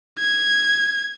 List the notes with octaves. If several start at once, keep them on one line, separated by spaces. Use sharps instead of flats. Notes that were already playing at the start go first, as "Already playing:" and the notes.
G#6